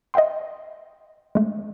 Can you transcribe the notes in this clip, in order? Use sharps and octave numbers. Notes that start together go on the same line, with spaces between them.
D#5 E5 F#5 G5 C6
G#3 A3